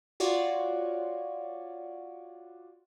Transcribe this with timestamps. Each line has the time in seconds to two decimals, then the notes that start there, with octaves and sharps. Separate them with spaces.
0.20 F4 F#4 C#5 D5